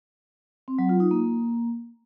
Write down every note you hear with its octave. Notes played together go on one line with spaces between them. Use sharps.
C4
F#3
F4
D#4
A#3